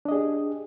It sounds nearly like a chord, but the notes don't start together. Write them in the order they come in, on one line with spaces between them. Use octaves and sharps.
D4 D#5 G#4 G4